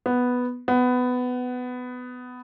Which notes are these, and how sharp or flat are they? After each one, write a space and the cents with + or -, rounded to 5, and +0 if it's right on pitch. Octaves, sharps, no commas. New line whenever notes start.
B3 +0
B3 +15